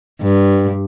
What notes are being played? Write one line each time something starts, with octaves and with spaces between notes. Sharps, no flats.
G2